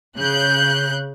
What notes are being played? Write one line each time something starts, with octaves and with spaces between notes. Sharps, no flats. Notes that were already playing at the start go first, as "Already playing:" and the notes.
C#3 F#6 G6